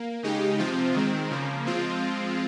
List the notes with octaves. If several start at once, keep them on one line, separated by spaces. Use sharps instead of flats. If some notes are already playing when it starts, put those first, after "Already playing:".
Already playing: A#3
C#3 G#3 D#4 G4
C3 F3 C4 F4
D#3 G#3 C4
C#3 F3 A#3
F3 G#3 C4 F4